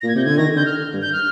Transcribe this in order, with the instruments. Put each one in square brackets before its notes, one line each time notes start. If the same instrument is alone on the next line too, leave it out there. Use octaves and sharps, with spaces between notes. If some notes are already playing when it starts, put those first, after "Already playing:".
[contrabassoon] A#2 [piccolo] A#6
[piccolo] G#6
[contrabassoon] C3 [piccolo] G6
[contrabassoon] D3 [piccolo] G#6
[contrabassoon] D#3 [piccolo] A#6
[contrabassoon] D3 [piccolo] G6
[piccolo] F6
[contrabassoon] G2
[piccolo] G6
F6